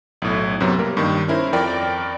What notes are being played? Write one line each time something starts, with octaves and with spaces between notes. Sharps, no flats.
B1 A2
F#2 C3 F#3 B3
G3 A#3 A#4
G2 D#3
C#4 E4 A#4 C5
F2 A#4 D5 G5